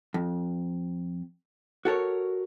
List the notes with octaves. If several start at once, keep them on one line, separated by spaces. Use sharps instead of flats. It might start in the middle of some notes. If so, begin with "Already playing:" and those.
F2
F#4 A4 A#4 C#5